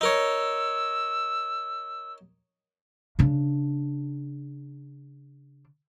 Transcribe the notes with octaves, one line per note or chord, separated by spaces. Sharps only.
D#4 A#4 C#5 E6
C#3 D4